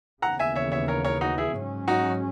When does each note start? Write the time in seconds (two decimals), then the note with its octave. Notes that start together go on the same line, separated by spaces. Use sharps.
0.22 D#2 C#3 E3 B3 F#5 A#5
0.39 E5 G#5
0.56 C#5 E5
0.72 C#5 E5
0.88 A#4 C#5
1.05 A#4 C#5
1.21 D#4 F#4
1.38 E4 G#4
1.55 G#2 F#3 C#4
1.88 D#4 F#4